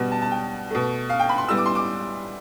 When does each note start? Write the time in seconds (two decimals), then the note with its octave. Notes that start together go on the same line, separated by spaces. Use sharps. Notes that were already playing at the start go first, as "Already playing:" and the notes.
Already playing: B2 G3 B3
0.11 A5
0.22 A5
0.31 G5
0.71 B2 A3
1.09 F5
1.19 G5
1.29 B5
1.38 C6
1.48 A2 G3 B3 E6
1.57 D6
1.66 C6
1.75 D6